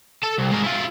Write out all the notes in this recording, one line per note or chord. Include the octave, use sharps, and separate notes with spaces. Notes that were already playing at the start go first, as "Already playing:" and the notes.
A4 A5
C2
G#3 A#4
E4 F4